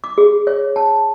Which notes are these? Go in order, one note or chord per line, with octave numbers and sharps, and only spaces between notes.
D6
G#4
C#5
A5